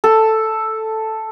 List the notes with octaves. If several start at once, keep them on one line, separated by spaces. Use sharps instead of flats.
A4